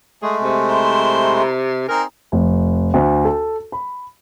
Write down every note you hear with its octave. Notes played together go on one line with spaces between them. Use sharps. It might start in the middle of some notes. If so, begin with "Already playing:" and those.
G#3 A3 G#4
C3
E4 A#4 C5
C4 D#4 G#4 A#4
F1
D2
A4
B5